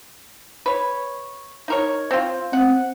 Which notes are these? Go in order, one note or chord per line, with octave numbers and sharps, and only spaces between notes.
B4 C#5
D#4 A#4 C#5
C4 F4
C4 F#5